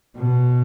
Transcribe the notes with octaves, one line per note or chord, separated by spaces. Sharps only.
B2